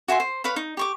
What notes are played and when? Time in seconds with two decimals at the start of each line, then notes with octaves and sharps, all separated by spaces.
0.08 F#4 E5 G#5 C6
0.20 C5
0.44 B4 C#5 F5 B5
0.56 D#4
0.77 G4 C#6 D6